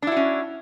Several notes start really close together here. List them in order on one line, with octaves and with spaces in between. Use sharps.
D4 E4 F#4 C#4